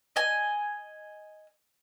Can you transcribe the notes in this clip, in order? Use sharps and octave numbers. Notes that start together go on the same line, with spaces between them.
D#5 G#5